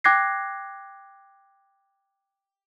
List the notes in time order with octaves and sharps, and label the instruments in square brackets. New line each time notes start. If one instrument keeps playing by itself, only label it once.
[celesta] G5 D6 F#6 G#6 A#6 C7